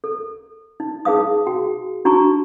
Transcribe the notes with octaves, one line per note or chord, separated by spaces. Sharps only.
A4
D#4
D#4 G#4 B4 F5 D#6
F#4 G5
D4 D#4 F#4 G#5 A#5 C#6